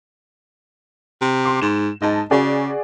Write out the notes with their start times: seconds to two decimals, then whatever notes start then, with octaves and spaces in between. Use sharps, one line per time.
1.21 C3
1.45 C6 D6
1.62 G#2 E7
2.02 G#2 D#5 A5
2.31 C#3 F#4 G#4 D5